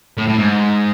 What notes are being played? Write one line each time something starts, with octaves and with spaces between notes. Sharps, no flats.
A2
A2
G#2